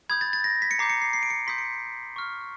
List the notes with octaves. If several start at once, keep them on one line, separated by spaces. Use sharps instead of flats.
B5 D#6 G6 G#6
A6
A6
A#6
B6
C#7
A#5 D6 G6 C7
C#7
C7
C7
D7
C#7
C6 D#6 G6 B6
C#7
C#6 F6